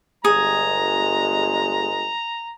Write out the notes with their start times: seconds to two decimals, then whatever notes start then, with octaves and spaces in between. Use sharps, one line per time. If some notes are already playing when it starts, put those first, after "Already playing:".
0.25 G1 G#3 G#4 A#5